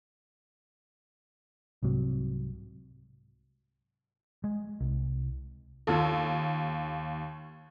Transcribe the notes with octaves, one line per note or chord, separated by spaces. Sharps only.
C2 G#2 C3 F#3
G#3
C2
D#2 F4 A4